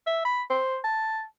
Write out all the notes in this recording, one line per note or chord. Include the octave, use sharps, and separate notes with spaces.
E5
B5
C5
A5